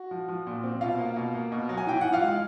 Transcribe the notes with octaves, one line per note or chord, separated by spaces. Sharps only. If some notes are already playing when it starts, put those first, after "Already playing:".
Already playing: F#4
F3
F3
A#2
C4
B2 F4 F5
A#3
B2
A#3
B2
F#3
G#5
E3 G5
E3 F#5
F4 F5
G#3